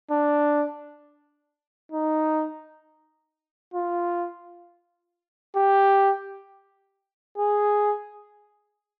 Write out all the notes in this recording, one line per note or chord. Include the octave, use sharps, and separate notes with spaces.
D4
D#4
F4
G4
G#4